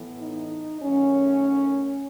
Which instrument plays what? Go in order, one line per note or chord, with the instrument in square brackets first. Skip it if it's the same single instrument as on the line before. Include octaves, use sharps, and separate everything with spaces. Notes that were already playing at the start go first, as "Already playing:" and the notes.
Already playing: [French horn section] A2 E3 B3
D#4
F#2 D#3 A3 C#4